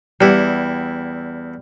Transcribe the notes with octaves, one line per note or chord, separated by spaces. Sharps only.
E2 G3 E4 F#5